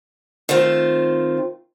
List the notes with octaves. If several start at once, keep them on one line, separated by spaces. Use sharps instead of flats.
D#3 A3 C4 F4